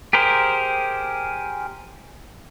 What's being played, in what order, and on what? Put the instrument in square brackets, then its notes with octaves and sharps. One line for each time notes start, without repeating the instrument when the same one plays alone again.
[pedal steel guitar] G4 G#4 A#4 C5